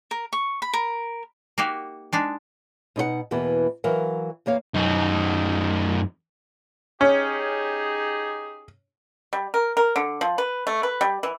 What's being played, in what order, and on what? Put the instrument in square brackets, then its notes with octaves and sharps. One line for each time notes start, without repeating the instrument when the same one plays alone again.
[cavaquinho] A#4
C#6
B5
A#4
[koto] A#3 D#4 F#4 G4
G#3 D4 D#4
[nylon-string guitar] B2 D#4 C#5 F#5
E2 B2 E3 A#3 B3
E3 F#3 A#4 F5
E2 A#3 C#5 F5
[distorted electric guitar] F#2 D#4
[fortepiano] C#4 [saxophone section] D#4 G4 G#4
[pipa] G3
A#4
A#4
D3
F3
B4
A3
B4
G3
E3